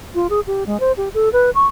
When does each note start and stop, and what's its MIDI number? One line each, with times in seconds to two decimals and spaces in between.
0.15 0.27 65
0.30 0.40 68
0.47 0.66 67
0.66 0.80 56
0.80 0.92 72
0.97 1.09 67
1.14 1.29 69
1.33 1.50 71
1.55 1.67 85